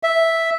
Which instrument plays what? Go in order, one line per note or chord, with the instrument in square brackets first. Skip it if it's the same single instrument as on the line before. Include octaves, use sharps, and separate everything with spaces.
[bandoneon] E5